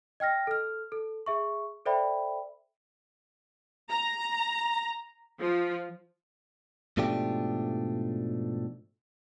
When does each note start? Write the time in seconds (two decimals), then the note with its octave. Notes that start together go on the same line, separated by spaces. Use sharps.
0.20 D#5 G5 F6 A#6
0.47 A4 F6
0.92 A4
1.26 G#4 E5 C#6
1.86 A4 C5 D5 E5 G5 B5
3.90 A#5
5.39 F3
6.97 G#2 B2 F3 A3 D4 G4